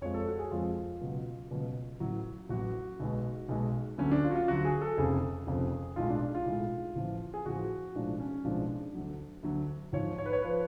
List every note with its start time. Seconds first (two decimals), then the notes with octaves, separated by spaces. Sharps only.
0.01 F2 F3 G#3 C#5
0.14 A4
0.27 F#4
0.39 G#4
0.51 F2 F3 G#3 F4
1.01 C#2 B2 F#3
1.50 C#2 B2 F#3
2.00 A1 A2 F#3
2.49 A1 A2 F#3 F#4
3.00 B1 B2 G#3
3.49 B1 B2 G#3
3.98 D2 D3 F#3 C#4
4.12 D4
4.24 F4
4.31 F#4
4.35 F4
4.48 D2 D3 F#3 F#4
4.65 G#4
4.81 A4
4.98 F1 F2 C#3 G#4
5.47 F1 F2 C#3
5.96 B1 A2 G#3 F4
6.10 D4
6.21 D4
6.35 F4
6.46 B1 A2 G#3
6.96 A1 A2 F3
7.34 G#4
7.46 A1 A2 F3 F#4
7.95 B1 A2 F3 G#3 D4
8.20 C#4
8.44 B1 A2 F3 G#3 D4
8.95 D2 D3 F#3
9.43 D2 D3 F#3
9.93 G#1 G#2 F3 C#5
10.18 C#5
10.26 B4
10.33 C#5
10.42 F3 B4